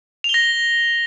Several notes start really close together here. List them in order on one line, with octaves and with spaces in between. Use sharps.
F7 G7 A#6